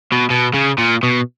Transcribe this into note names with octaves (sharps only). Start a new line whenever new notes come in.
B2
B2
C#3
A#2
B2